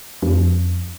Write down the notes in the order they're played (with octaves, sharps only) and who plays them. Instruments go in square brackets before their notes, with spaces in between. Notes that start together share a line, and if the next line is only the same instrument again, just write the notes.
[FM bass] F2